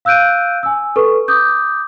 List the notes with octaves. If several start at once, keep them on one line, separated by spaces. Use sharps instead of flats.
F5 E6 F#6 G6 D7 D#7
G#5 E6
A4 B4 C#6
D6 D#6 G6